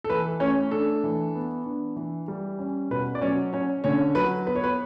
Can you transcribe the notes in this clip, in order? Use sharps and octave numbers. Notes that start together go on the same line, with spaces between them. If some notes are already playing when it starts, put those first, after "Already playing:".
A4
E3 B4
A3 C#4 C#5
D4 A4
E3
B3
D4
E3
G3
C#4
B2 B4
D5
F#3 C#4 C#5
C#4 C#5
D3 C#4 C#5
F#3 B4
B3 B4
C#5
B4